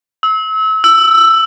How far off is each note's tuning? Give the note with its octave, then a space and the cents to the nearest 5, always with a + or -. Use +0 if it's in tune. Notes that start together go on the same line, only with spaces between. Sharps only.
E6 -30
E6 +10